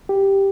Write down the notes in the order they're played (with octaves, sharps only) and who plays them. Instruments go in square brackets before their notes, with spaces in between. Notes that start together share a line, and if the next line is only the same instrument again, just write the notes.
[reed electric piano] G4